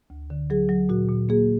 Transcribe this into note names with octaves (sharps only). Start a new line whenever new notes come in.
D2
D3
F#3 G#4
F#3
A#2 F#4
A#2
A#3 G#4